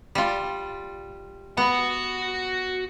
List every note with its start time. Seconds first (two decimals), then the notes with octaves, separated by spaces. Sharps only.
0.15 G3 F4
1.57 B3 F#4 F#5